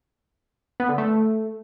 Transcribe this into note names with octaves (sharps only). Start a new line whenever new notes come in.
B3
D3
A3